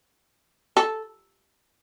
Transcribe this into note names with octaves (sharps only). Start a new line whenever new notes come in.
A4